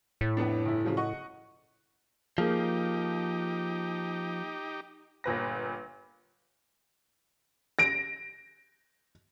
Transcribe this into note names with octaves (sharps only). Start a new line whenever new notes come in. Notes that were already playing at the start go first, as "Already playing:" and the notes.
A2
F2 B3 D4
G1 E4
C#3 F3 F#3
D#5 F#5 C#6
F3 A#3 D#4 G4 G#4
G1 A#2 B4 A#6
A#6 D7